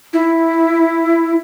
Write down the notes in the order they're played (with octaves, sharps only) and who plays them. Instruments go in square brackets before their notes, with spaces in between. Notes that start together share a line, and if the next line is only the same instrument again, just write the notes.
[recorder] E4